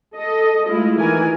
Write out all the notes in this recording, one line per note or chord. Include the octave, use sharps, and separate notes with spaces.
A4 D#5
G#3 A3 E4 F4
D#3 E3 E4 A#4 G#5